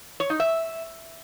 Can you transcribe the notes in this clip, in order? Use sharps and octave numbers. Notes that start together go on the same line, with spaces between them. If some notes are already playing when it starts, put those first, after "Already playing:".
C#5
D#4
E5